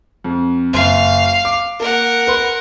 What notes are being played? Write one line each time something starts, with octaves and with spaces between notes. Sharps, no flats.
F2
F#1 F5 C6
D6
A#3 A#4 F#5
B4 C6